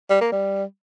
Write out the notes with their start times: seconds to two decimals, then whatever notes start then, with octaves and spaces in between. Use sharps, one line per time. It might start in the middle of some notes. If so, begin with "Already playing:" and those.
0.10 G3
0.21 A#3
0.32 G3